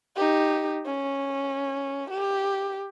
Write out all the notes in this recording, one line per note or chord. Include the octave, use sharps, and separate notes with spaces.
D#4 G4
C#4
G4